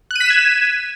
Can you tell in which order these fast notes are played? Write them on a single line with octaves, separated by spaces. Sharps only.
F#6 D#7 B6 E7 G#6